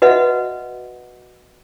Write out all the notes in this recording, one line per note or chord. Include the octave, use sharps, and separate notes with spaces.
F#4 B4 D#5 E5 F#5